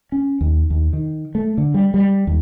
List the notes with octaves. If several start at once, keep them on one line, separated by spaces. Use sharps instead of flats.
C#4
D#2
D#2
D#3
A3
D3
G3
G3
D#2